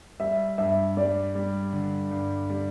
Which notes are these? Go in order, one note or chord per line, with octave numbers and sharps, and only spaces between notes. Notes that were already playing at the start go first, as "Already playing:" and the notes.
G3 E5
G2 E5
G3 D5
G3
D3
G2
G3